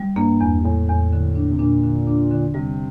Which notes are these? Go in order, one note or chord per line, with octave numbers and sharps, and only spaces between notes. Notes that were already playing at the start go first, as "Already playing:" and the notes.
Already playing: G3
G2 A#3
E2
E2 A2
E2
D3
D4
C3
A#2 D4
D3
D4
D3
C3 G3